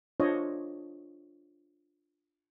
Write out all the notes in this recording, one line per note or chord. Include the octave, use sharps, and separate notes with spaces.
D4 F4 C5 C#5 D#5